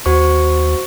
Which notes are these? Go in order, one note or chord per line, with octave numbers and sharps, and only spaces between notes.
D#2 F#4 C5 C#6